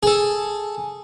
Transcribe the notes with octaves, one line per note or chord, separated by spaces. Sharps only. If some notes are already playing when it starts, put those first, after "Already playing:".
G#4 A4